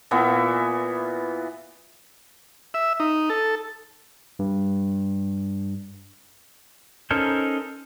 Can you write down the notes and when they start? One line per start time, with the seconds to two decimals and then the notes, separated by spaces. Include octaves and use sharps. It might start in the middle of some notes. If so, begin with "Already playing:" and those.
0.11 A#2 E3 B3 E5
2.74 E5
3.00 D#4
3.30 A4
4.39 G2
7.11 C#4 D#4 A4 A#4 C5